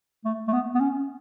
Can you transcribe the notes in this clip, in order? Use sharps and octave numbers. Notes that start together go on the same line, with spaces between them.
A3
A3
B3
B3
C#4